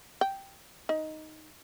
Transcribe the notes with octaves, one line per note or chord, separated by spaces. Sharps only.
G5
D#4